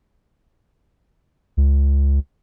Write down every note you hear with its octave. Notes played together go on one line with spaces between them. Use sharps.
C#2